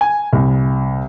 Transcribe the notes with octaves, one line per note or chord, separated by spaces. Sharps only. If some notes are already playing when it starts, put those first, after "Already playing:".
G#5
C2